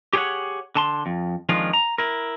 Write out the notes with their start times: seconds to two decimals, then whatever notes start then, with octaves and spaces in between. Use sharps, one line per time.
0.13 G4 G#4 C5 C#5 F#5
0.75 D3 A5 C6
1.06 F2
1.49 F2 D#3 F3 G#3 D4 F4
1.73 A#5
1.98 E4 A#4